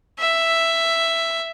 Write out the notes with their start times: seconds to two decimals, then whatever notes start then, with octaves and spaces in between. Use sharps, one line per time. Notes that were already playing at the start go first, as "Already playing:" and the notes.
0.20 E5